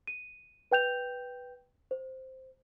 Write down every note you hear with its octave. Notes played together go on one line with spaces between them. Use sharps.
D#7
B4 G5 G6 F7
C5